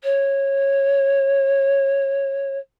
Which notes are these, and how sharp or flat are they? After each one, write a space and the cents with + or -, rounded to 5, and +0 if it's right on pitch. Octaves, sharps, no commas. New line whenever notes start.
C#5 -15